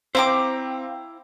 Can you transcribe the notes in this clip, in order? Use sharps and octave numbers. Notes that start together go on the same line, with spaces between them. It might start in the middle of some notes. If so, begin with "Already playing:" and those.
C4 E4 C5 F5 G5 A#5 D6